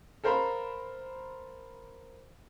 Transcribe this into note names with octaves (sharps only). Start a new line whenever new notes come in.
A4 A#4 C5 F5 A#5 B5